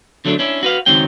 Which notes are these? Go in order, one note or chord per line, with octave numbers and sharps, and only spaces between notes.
D3 F#3 A3 C4 D4
C#4 D4 E4
F#4 B4 F5
C#2 F#2 D#3 F#3 C4 G5